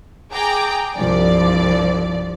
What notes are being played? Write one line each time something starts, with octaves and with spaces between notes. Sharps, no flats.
G#4 G5 A#5 D6
C2 G2 F3 D5